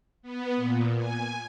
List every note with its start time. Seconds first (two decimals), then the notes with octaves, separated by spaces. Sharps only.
0.22 B3
0.56 A#2
0.97 G#5